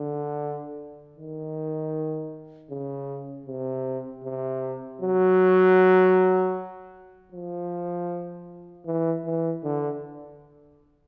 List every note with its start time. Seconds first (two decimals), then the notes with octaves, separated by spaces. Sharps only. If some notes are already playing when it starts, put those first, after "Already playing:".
Already playing: D3
1.16 D#3
2.70 C#3
3.46 C3
4.24 C3
5.02 F#3
7.32 F3
8.86 E3
9.25 E3
9.64 D3